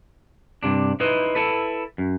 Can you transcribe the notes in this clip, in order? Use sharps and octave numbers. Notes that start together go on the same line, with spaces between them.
G2 C3 D4
D#4 E4 B4 C5 D#5
E4 A4 B4
F#2